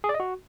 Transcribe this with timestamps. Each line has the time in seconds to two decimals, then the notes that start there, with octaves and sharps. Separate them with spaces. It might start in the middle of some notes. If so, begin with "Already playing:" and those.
0.04 G#4
0.09 D5
0.14 D#5
0.20 F#4